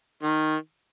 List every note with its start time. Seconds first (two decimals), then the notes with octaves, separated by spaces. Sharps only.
0.23 D#3